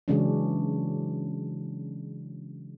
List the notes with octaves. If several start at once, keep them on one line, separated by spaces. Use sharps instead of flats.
C#3 E3 F#3 G#3 C#4 D4